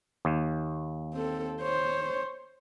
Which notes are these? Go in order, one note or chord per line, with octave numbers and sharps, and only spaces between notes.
D#2
C4 A4
C5 C#5